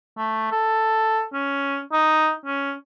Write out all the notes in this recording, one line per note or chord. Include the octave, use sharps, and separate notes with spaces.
A3
A4
C#4
D#4
C#4